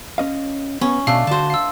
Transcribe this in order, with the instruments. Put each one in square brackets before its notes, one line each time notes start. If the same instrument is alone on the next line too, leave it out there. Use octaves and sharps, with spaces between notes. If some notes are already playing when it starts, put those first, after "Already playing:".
[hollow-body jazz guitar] C#4 D#5 F5
[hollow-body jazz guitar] B3 [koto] C#4
[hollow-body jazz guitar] B2 [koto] A3 D4 [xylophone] F5
[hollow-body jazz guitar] D3 F#4 [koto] C5 A5
[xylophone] F5 E6